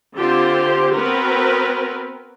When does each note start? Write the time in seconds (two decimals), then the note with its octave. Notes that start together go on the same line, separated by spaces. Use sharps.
0.16 D3 C4 F4 G4 C5 C6
0.95 B3 C4 F#4 A#4 B4